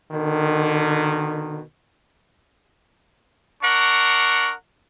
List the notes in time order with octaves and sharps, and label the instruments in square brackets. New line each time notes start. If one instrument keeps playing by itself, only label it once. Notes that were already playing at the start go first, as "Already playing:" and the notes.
[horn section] B2 D3 D#3
[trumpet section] D4 A#4 F#5 C#6